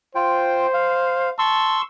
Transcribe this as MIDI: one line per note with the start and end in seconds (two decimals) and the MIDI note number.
0.15 0.67 65
0.15 1.31 72
0.15 0.67 79
0.74 1.30 77
1.39 1.80 81
1.39 1.82 84
1.39 1.82 85
1.39 1.82 88